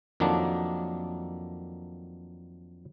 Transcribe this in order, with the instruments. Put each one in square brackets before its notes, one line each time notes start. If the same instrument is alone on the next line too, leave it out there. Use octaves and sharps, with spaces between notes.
[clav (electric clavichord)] F2 D#3 F#3 A#3 D4